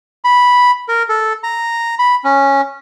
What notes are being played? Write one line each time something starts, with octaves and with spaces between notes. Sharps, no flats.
B5
A#4
A4
A#5
B5
C#4